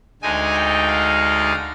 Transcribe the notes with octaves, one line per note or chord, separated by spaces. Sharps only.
D2 D3 G#3 D#4 G#5
G5
F5